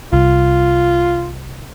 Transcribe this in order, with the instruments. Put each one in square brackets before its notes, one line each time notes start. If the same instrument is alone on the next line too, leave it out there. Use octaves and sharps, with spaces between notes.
[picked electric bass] C2 [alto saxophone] F4